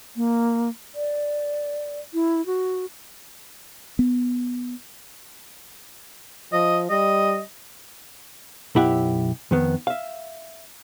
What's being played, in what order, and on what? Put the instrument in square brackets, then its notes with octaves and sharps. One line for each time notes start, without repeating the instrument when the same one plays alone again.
[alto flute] A#3
D5
E4
F#4
[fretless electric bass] B3
[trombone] F3 [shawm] D#5
[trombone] G3 [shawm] D#5
[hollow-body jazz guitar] B1 F#2 E4 G4 E5 F#5
F2 D#3 B3
E5 F5